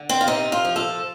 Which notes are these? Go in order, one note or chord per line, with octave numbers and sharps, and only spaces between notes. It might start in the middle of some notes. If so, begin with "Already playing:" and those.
Already playing: D3
C4
F4
C3 D#4
F4
F3
A4